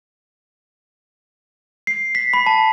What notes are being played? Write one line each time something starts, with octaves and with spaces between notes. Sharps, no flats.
C7
B6
B5
A5